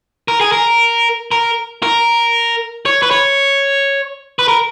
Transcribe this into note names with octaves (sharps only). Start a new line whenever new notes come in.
A#4
G#4
A#4
A#4
A#4
C#5
B4
C#5
B4
A#4